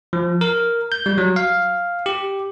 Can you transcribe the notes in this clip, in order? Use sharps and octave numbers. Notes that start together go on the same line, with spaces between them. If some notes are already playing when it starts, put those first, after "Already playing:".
F3
A#4
G6
G3
F#3
F5
G4